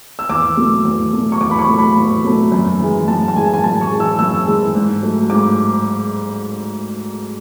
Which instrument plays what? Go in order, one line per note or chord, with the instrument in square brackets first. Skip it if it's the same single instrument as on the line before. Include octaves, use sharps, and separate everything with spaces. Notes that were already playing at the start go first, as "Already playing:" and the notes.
[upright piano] E6
E2 D6
B2 F#3 A3
E2
B2 F#3 A3
C#6
E2 D6
B5
C#6
B2 F#3 A3
B5
E2
B2 F#3 A3
F#2
E3 G#3
F#2 A5
A5
E3 G#3 G#5
G#5
F#2 A5
C#6
G#3
E3 E6
F#2 E6
E3 G#3
G#2
F#3 A3
G#2 D6